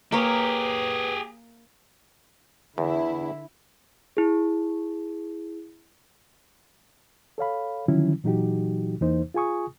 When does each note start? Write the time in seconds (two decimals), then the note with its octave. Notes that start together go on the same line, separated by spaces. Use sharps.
0.12 A#3 G4 G#4 B4 C#5
2.78 E2 D3 E4
4.17 E4 G#4
7.38 A4 C#5 F5 B5
7.88 D3 D#3 F3 F#3 C#4 E4
8.24 A#2 E3 F#3 D#4 F#4 G4
9.01 E2 E3 A#3 D#4 C5
9.34 F4 G#4 G#5 C#6 D#6